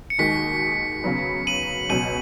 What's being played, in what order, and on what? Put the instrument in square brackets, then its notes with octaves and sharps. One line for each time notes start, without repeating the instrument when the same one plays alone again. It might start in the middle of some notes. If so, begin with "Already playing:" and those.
[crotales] C#7
[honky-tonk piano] D#2 D#3 G#3 D#4 F#4 [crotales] B6
[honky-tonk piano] C#3 F#3 B3
[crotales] D#7 F#7
[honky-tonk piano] C#2 B2 F#3 [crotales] D#7 F#7